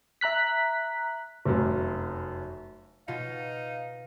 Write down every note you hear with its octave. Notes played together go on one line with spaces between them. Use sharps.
E5 A#5 F#6 B6
F1 F#2
B2 D#4 F4 F5